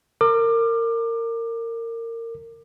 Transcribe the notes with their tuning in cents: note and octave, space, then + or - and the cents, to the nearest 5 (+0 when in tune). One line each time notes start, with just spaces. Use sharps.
A#4 -25 D6 +25